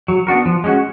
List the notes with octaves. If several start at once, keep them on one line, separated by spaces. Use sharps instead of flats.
F#3
B3 D4 F#4 A#4
F3
G#3 C#4 F#4